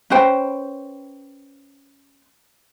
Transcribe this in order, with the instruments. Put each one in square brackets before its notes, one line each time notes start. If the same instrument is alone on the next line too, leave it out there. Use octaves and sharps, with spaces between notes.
[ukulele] C#4 B4 C5 G5